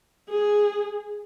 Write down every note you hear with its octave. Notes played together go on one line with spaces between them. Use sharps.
G#4